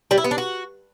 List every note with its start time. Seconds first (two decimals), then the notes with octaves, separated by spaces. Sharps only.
0.11 G3
0.18 E4
0.24 B3
0.31 D4
0.38 F#4